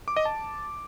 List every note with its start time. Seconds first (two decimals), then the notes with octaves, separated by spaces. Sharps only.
0.08 D6
0.17 D#5
0.25 A5